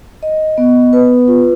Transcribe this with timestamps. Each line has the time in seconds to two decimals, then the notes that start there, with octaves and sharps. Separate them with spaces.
0.23 D#5
0.58 B3
0.93 B4
1.28 F4